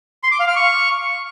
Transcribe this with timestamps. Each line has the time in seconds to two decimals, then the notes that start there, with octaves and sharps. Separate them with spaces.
0.23 C6
0.31 D6
0.40 F5
0.48 F6
0.56 C#6